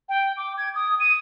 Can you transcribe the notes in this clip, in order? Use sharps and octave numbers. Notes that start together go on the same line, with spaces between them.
G5
D6
G#6
D#6
D#7